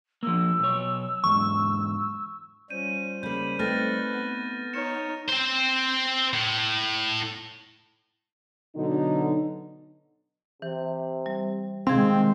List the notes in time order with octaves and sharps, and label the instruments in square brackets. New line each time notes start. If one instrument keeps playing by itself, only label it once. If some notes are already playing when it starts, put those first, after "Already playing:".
[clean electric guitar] F3 A#3 [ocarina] E6
[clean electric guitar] B1 C#5
[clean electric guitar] E2 G#2 [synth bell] C#6
[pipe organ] G3 C5 [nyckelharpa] C#4 F4 [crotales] D#7
[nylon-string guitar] C#3 A#3 [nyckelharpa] B5 [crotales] G6
[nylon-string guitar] A3 C4 D#4 [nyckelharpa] B4 [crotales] F6 A6 A#6
[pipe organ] B3
[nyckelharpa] D#4 C#5 [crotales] F6 C#7 E7
[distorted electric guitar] C4 C5
A2
[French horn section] B2 D3 F#3 D#4
[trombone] C3 [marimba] E3
[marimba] G3
[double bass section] C3 D#3 G#3 [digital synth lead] C4 [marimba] G#4 F5